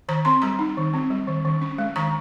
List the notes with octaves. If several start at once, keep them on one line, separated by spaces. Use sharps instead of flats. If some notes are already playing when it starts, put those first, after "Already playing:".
D#3 A#5
C4 C6
G3 A#5
D#4
D#3
C4
G3
D#3
D#3
C#4
G#3
D#3 A#5